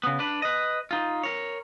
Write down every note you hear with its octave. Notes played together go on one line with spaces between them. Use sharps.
C#3 B3
D4 B4
B4 D#5
D#4 F4
A#4 C#5